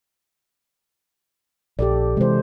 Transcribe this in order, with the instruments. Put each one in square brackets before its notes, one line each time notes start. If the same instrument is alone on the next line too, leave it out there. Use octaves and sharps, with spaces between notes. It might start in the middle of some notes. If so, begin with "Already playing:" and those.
[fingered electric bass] A#1 [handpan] G4 A4 D5
[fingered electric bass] C3 E3 [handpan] G#3 C5